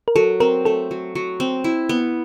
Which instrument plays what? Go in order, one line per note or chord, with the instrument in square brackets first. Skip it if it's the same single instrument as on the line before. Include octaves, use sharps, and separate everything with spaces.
[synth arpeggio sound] A#4
[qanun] F#3 [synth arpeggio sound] A4
[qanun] C4 [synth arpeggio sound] A#4
[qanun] A3 [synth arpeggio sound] A4
[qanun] F#3
F#3
C4
E4
B3